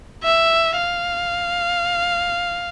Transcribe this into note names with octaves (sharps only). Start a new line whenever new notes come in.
E5
F5